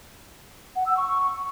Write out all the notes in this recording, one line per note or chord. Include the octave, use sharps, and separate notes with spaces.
F#5
E6
C#6
C#6